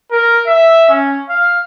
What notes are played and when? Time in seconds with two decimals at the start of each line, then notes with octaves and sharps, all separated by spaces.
0.11 A#4
0.47 E5
0.89 C#4
1.29 F5